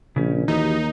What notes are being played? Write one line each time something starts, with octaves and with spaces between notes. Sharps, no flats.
A#1 C#3 C#4
D#2 E3 D#4 F#4 G4